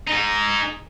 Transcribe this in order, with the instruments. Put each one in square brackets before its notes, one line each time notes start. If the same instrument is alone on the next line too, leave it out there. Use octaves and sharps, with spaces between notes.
[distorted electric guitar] D#4 G#4